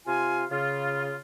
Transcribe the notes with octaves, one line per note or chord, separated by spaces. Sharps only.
C3 F4 F5 G#5
C#3 F4